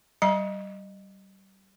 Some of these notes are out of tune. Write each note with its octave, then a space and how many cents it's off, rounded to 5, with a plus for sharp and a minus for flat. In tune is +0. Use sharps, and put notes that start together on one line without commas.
G3 -25 E5 -5 A#5 +40